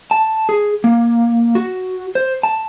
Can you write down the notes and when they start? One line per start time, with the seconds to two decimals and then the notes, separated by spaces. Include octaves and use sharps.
0.11 A5
0.49 G#4
0.84 A#3
1.55 F#4
2.15 C5
2.43 A5